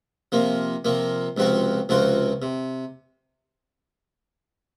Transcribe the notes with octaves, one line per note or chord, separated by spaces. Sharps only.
C3 F3 A#3
C3 F3 A#3
C#2 C3 F3 C4 F#4
C#2 C3 F3 C4 F#4
C3